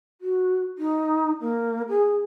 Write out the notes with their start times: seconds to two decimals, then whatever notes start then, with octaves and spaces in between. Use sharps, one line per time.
0.21 F#4
0.78 D#4
1.41 A#3
1.89 G#4